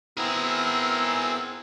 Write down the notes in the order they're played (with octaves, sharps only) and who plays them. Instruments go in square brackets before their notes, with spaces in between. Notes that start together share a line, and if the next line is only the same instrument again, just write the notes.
[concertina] B3 C4 E4 [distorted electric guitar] G#4 A#4